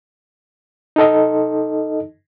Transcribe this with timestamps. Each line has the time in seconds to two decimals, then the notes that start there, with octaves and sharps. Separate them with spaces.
0.96 D#4 A4 D#5